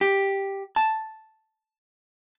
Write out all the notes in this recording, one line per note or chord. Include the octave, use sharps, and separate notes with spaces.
G4
A5